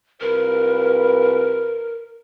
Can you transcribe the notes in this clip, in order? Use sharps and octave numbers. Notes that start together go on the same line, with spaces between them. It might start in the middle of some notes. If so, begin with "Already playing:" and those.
C2 F4 A#4 B4